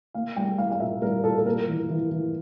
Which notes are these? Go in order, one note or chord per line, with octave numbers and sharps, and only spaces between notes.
A#3 F5
G3 G5
G3 F5
F5
A#2 E5
G3 A#4
A#2 A4
A4
A#3 A#4
E3
E3
E3